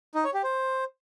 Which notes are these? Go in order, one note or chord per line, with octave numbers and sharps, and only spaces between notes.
D#4
C#5
G4
C5